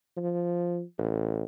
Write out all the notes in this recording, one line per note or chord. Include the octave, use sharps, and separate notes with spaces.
F3
A1